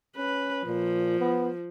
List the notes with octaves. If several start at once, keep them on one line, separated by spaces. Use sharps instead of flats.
C#4 B4
A#2 F3
B3